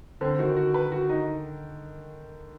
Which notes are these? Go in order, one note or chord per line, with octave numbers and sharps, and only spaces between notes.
D3 C4
D#3 F#4
F#4
B4
F#4
D#4